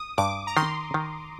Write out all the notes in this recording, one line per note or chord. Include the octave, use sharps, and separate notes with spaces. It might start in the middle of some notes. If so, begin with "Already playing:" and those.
Already playing: D#6
G2 D6
A#5
D#3 C6
D#3